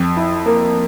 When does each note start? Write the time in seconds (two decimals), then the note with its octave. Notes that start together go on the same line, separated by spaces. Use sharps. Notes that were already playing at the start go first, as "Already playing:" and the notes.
Already playing: F2
0.17 E4
0.46 A#3